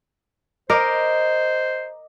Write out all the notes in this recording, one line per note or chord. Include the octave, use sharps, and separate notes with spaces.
A#4 C5 D#5 D6